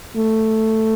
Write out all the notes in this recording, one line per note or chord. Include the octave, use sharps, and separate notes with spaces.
A3